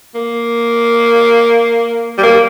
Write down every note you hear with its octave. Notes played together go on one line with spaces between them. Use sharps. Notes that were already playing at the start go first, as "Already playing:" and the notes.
A#3
G3
A#3